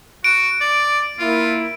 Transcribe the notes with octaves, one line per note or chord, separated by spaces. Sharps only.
F#4 D7
D5
A#3 E4 F4